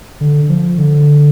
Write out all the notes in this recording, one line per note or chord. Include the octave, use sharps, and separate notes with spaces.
D3
F3
D3